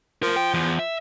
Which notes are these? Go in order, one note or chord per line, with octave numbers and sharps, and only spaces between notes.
F3 A3 A#4
G5
E2
E5